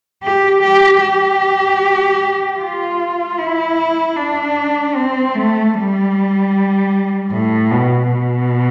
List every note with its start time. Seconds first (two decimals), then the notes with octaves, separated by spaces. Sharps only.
0.23 G4
0.62 G4
1.01 G4
2.59 F4
3.38 E4
4.16 D4
4.95 C4
5.35 A3
5.73 G3
7.31 A2
7.71 B2
8.10 B2